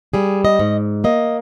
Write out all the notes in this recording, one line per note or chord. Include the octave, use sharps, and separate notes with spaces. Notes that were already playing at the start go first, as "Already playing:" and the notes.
G3 G#4
D#5
G#2
A#3 D#5